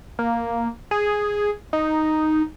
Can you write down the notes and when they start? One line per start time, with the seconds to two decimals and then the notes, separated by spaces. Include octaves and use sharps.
0.19 A#3
0.91 G#4
1.73 D#4